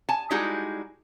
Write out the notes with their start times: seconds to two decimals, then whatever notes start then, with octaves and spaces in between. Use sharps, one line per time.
0.09 G#5 A5
0.30 G3 G#3 D#4 E4 F#4 G#4